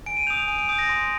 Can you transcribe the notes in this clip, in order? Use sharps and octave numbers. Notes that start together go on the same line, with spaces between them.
G#5 D7
D#7
D#6 G6 F7
F7
G#5 D#7
D7
D#6 G6
A#6
C6